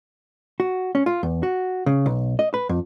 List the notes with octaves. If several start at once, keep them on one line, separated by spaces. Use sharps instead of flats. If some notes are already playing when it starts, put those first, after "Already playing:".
F#4
C#4
F4
E2
F#4
C#3
B1
D#5
B4
F2